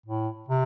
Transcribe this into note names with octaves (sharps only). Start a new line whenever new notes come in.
A2
C3